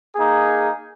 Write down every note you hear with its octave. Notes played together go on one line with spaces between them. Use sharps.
A#3 D#4 G#4